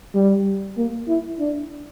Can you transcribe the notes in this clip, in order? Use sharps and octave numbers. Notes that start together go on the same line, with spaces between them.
G3
A#3
E4
D4